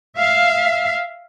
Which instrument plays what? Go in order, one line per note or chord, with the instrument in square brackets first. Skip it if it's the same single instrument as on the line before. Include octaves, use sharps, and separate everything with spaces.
[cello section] E5 F5